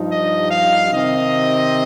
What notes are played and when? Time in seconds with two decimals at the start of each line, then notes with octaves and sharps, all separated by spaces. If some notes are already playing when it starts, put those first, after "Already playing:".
Already playing: G2 F3 D#4
0.11 D#5
0.51 F5
0.92 C3 D#3 C4 D#5